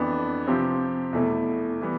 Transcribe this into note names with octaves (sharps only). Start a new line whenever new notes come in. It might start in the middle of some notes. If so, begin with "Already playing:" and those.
Already playing: F2 E3 B3 D4
C3 F3 C4 G4
E2 B2 A3 E4
E3 G3 B3